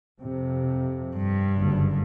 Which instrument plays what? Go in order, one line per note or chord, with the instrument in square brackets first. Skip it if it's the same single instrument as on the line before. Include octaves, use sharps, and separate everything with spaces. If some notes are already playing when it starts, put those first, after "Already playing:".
[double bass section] F2 C3
[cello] G2
[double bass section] F#1 D3